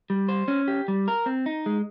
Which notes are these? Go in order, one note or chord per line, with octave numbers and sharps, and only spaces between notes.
G3
C5
C#4
G4
G3
A#4
C4
D#4
G#3